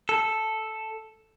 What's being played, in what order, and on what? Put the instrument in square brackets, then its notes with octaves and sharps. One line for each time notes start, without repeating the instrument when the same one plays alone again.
[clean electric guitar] A4